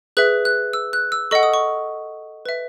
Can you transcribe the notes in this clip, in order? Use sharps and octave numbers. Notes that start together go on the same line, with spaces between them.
G#4 B4 E5 F#6
F#6
E6
F#6
E6
A4 D#5 F#5 C#6
D#6
C#6
B4 E5